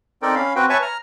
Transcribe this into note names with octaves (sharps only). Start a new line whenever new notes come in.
C4 D#4 A4 A#4 D5 G5
C#4 F5 B5
C4 F#4 B4 G5
B4 C#5 E5 G#5 A5 C#6
A#5 F6